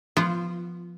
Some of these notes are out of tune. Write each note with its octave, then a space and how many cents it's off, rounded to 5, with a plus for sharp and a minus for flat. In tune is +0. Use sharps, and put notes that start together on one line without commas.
F3 +0 B3 +0 F4 -20